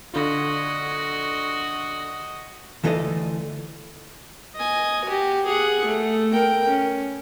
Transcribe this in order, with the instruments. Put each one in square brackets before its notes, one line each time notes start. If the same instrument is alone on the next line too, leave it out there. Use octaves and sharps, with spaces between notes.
[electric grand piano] D3 F4 [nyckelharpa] F#4 D#5
[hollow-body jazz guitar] D2 E3 A3 F4 A4 D#5
[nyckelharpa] D#5 G#5
F#4 G4
G#4 F#5
A3
A#4 G5
C#4